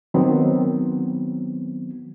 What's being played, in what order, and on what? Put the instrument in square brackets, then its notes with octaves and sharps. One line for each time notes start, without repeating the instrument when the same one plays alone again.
[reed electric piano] D#3 F#3 B3 C4